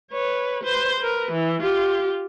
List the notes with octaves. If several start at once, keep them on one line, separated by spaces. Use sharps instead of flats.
B4 C#5
B4 C5
A#4 B4
E3
F4 G4